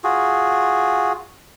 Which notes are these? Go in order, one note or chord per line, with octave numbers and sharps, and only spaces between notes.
F4 F#4 G#4